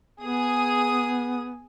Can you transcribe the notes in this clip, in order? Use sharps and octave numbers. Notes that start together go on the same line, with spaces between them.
B3 G#4 D#6